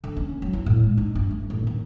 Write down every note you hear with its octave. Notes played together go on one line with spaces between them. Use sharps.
D3
C#4
F#3
E4
A2
G#3
D#4
G2
A3
A1
D#3